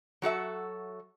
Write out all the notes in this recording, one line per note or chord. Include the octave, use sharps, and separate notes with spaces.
F#3 F#4 A4 E5